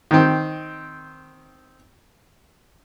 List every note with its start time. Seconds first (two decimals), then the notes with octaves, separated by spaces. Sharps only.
0.11 D#3 C4